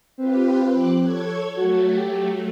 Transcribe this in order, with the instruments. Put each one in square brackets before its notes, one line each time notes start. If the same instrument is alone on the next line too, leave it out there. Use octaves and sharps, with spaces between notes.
[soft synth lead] C4 [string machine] F4 G4 B4
[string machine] F3 D6 F#6
A4 C#5 G#6
[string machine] F#3 A3 [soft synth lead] F#4
[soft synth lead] G4